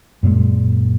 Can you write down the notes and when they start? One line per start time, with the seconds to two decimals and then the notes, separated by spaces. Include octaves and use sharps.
0.23 F#2 A#2 G#3